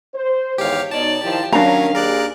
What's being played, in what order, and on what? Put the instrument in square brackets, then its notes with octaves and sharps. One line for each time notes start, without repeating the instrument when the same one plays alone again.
[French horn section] C5
[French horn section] E2 G#2 D#3 [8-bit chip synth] G4 F5 [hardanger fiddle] C#5
[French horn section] B2 D#4 [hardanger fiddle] C#5 D5 [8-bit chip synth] A5
[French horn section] D#3 F3 E4 [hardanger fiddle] G4
[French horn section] D#3 C#4 A#4 [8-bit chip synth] F#3 [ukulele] D4 A#5 [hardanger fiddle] F5
[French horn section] D#2 G#4 [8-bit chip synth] A#4 D5 F#6